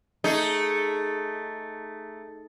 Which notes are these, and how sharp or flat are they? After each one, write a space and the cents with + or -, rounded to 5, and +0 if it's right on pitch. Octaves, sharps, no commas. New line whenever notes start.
A3 +0 D#4 +0 G#4 +0